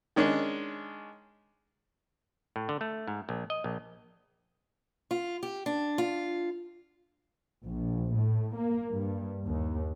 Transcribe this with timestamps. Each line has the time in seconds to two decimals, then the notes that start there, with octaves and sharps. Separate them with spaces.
0.16 D#3 G#3 C#4 D4
2.56 A2
2.69 D3
2.81 A3
3.08 G#2
3.29 A#1
3.50 D#5
3.64 A#1
5.11 F4
5.43 G4
5.66 D4
5.98 F4
7.65 A#1
8.16 A2
8.56 A#3
8.92 G2
9.47 D#2